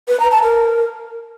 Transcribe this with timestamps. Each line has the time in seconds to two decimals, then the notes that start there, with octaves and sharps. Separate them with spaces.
0.08 B4
0.20 A#5
0.31 A5
0.43 A#4